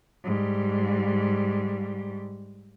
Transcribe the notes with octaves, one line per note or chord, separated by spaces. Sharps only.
G#2 G3